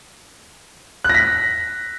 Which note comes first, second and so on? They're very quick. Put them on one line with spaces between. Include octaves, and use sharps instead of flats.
F#6 A#6 B6